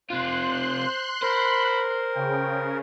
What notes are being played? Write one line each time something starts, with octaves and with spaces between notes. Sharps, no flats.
C3 F4 C5 C6 F#6
A#4 C5 B5
C#3 G5